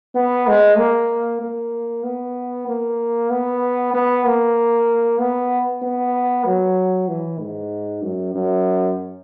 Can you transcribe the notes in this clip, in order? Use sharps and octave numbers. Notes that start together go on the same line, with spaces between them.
B3
G#3
A#3
A#3
B3
A#3
B3
B3
A#3
B3
B3
F#3
E3
G#2
F#2
F#2